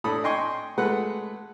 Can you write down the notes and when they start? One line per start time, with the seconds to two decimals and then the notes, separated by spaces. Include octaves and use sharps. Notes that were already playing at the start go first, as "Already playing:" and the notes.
0.04 A2 D4 A4 B5 D#6
0.24 D#5 G5 G#5 C6 C#6
0.78 G#3 A3 B4 F#5